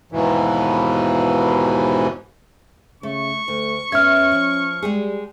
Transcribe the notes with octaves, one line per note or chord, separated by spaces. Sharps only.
D#2 G#2 B2 E3
C#3 A3 C#6
D2 A3
E2 C3 C#4 E5 F6 G#6
F3
G3 G#3 G4 G#4